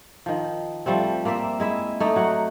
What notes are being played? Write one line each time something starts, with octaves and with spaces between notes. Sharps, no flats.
D#3 F3
F3 G3 A3 C4
A#3 C4 D5 E5
G#3 E4 E5
A3 D#4 D5
F#3 F#5